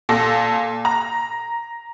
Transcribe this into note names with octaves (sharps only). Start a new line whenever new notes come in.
A#2 A4 A#6
A#5